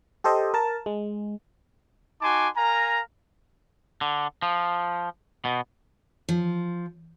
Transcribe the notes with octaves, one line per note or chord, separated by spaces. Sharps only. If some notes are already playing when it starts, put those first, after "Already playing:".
G4 A4 C5 D#5
A#4 A5
G#3
D#4 F#4 G#5 A5 C6 D6
A#4 F5 G#5 A#5
D3
F3
B2
F3